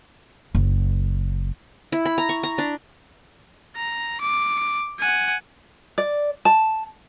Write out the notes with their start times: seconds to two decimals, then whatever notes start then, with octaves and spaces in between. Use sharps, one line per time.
0.55 F#1
1.92 E4
2.05 B5
2.18 A#5
2.29 C#6
2.43 A#5
2.58 D4
3.76 A#5
4.21 D6
4.99 F#5 G#5
5.98 D5
6.45 A5